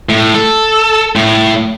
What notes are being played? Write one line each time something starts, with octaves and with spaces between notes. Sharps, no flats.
A2
A4
A2